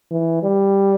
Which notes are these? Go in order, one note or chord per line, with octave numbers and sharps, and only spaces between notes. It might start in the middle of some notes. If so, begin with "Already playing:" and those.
E3
G3